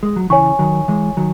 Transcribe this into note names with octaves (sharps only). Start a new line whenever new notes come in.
G#3
F#3
C#3 E3 C#5 G#5 C#6
D#3 F#3
E3 G#3
D#3 F#3